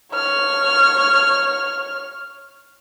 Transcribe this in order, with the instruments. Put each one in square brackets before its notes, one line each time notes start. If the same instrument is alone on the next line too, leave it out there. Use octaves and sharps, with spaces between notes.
[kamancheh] C#5 F6